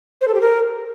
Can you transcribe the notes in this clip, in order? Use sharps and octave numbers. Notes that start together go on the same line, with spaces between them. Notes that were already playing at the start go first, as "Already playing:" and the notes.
C5
A4
G4
A#4